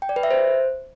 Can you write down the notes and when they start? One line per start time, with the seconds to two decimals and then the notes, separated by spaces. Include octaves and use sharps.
0.02 G5
0.09 D5
0.16 B4
0.23 E5
0.31 C5